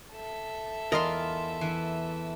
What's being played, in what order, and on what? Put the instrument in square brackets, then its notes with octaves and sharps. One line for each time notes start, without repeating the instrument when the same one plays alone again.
[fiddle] A4 E5
[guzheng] E2 F4 C6 [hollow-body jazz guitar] A#4 D#5
[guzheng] E3